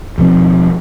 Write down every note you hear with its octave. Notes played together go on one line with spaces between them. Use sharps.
D#1 B2 F3 C4